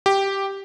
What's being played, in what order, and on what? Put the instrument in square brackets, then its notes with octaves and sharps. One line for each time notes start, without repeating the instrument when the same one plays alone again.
[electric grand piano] G4